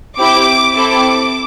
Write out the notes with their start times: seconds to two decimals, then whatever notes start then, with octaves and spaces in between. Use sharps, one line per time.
0.19 C4 E4 G4 D6
0.75 C4 E4 A4 D6